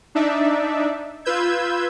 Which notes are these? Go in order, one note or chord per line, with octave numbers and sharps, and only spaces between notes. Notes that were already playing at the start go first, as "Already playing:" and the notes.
D4 D#4 D5 E5
F4 B4 E6 G6 G#6